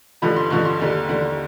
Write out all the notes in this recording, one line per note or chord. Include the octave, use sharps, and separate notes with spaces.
A1 G2 D3 F3 B5
C6
A1 G2 D3 F3 C#6
C6
D#2 D3 G3
D#2 D3 G3